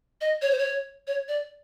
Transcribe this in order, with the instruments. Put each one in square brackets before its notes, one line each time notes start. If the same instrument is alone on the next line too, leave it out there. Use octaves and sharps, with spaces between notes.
[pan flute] D#5
C#5
C5
C#5
C#5
D5